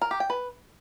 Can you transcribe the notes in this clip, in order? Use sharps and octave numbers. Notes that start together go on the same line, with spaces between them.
A#4
G4
G5
B4